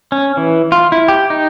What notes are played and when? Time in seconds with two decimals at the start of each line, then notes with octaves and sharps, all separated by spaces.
0.12 C#4
0.37 E3
0.72 F4
0.92 E4
1.08 G4
1.30 D#4